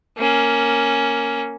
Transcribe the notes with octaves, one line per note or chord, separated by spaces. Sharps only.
A#3 C#4